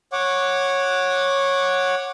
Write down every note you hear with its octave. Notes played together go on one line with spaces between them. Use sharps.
C#5 F#5 D6